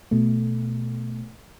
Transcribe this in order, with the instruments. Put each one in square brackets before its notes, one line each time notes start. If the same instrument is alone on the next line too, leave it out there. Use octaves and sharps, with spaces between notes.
[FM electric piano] B2 A3